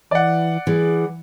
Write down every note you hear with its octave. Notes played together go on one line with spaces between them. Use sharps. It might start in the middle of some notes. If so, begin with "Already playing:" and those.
E3 D5 F#5
E3 G#4